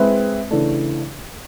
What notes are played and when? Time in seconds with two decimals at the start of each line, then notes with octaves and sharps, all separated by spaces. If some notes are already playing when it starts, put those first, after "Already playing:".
Already playing: G#3 C4 E4 G#4 B4
0.51 C#3 E3 A3 D4